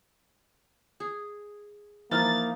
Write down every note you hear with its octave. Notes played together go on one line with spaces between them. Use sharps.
G#4
E3 F3 A#3 D#4 F6 A6